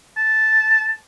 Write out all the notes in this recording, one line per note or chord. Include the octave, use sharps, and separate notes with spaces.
A5